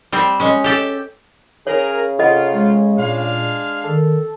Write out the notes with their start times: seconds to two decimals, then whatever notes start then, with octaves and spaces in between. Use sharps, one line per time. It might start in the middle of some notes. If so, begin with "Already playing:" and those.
0.12 G3 C4
0.40 G#3 C#4
0.64 G4 A4 G5
1.67 C#3 G#4 A#4 C#5
2.19 C3 F4 A4 D#5 F#5
2.53 G#3
2.98 A#2 G#3 D4 F5
3.84 D#3 A4